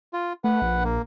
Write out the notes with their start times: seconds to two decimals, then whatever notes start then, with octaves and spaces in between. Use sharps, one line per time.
0.13 F4
0.44 A3 B4 F#5
0.62 A#1
0.84 A#3